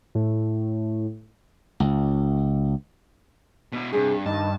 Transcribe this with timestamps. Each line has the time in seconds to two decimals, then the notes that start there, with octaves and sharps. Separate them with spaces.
0.15 A2
1.80 C#2
3.72 B2 B3 E4
3.93 G2 C3 C4 G#4
4.26 G2 D#3 D#4 D#5 A5